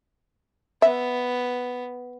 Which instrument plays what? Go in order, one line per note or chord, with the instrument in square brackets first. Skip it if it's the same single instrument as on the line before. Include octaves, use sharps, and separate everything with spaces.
[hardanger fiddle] B3 [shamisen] E5